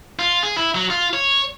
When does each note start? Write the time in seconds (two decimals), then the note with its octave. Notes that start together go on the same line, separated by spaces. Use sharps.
0.19 F4
0.43 G#4
0.57 E4
0.75 F#3
0.90 F4
1.13 C#5